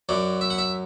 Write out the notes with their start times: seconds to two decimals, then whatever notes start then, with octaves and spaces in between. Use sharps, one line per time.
0.09 F#2 F#3 D5
0.41 E5
0.50 F#5
0.58 E5